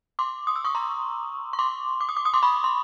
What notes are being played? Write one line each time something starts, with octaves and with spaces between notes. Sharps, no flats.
C6 D6
D#6
E6
C#6 D#6
A#5 C6
C#6
C6 D6
D6
D#6
D6
D#6
C6 D6
B5 C#6
C6